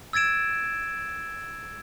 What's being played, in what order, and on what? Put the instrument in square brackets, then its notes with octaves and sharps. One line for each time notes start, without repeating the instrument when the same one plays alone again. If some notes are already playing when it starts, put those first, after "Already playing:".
[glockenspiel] E6 G#6 A6 D7 E7